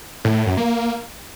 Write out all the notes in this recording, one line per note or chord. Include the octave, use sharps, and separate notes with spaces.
A2
A2
F#2
A#3